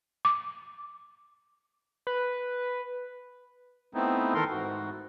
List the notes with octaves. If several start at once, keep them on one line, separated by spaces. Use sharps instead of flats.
D6
B4
A3 B3 C4 D#4 E4
D#3 E3 A4 A#4 C6
G#2 F#4